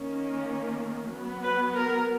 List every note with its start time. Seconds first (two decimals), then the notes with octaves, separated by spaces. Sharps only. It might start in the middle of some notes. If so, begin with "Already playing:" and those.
Already playing: D#3 A#3 C#4
1.10 F#3 B3
1.43 B4
1.74 A#4